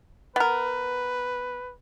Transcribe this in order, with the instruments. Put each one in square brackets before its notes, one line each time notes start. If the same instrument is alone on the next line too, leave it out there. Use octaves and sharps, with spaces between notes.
[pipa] B3 A#4 [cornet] B4